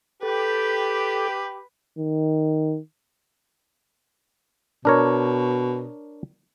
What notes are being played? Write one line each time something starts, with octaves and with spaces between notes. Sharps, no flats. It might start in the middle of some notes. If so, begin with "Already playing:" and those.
G4 A4 B4
D#3
B2 D4 A#4 C#5